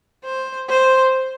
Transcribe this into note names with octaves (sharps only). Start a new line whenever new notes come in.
C5
C5